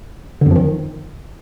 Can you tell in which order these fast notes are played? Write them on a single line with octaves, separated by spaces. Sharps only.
D3 F2 F3 D#3